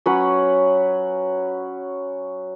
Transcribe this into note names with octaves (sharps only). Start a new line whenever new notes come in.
F#3 C#4 B4 F#5